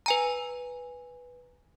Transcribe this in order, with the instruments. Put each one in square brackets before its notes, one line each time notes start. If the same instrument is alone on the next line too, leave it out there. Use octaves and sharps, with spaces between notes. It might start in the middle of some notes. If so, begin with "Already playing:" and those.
[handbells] B4 G#5 A#5